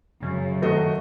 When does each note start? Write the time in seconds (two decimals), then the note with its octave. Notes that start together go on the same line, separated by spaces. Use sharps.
0.23 F#2 C#3
0.62 D#3 A3 F#4 D#5